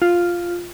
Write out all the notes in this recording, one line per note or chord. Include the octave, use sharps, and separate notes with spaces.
F4